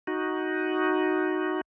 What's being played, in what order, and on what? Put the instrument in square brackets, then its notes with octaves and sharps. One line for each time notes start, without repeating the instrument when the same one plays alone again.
[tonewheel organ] D#4 F#4